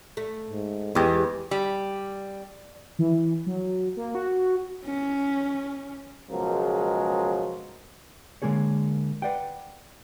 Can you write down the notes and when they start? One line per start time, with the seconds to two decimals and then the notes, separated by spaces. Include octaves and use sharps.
0.17 A3
0.50 G#2
0.95 E2 G#3 G4 B4
1.51 G3
2.99 E3
3.46 F#3
3.97 A#3
4.15 F#4
4.85 C#4
6.31 C#2 B2 F3 F#3 G#3 A#4
8.42 D3 E3 G#3 A#3 G#4 C#5
9.22 B4 D5 F#5 G5